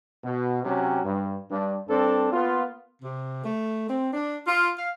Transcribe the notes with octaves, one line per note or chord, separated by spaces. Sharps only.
B2
C3 F#3 C#4 G4
G2
G2 D4
G2 C4 D4 A4
A#3 B3 F4
C3
A3
C4
D4
F4
F5